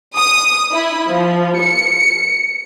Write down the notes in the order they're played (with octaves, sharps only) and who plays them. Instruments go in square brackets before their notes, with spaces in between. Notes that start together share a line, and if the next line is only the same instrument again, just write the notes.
[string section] D#6
E4
F3
C#7